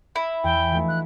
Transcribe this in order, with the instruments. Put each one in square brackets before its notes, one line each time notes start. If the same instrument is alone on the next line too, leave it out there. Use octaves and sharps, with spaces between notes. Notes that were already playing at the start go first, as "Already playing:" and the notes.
[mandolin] E4
[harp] E2 [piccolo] G5
[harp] F3 A3 D#4
[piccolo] F#6